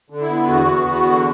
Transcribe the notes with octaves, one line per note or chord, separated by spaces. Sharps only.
D3
E4
B3
E2 F#4
B3
E2 F#4
D3